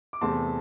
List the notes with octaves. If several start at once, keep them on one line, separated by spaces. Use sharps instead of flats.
D6
E2 C3 E3 A3 C4 A5 C6